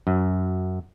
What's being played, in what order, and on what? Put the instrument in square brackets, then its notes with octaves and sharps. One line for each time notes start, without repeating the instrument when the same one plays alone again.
[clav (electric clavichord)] F#2